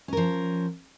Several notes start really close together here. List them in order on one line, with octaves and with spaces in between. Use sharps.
C#4 A#4 F3